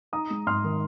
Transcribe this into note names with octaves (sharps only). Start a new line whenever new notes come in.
D#4 A#5 D#6
G#3
G#2 C6 F6
D#3